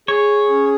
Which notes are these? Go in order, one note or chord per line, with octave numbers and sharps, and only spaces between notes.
G#4 C#5
C#4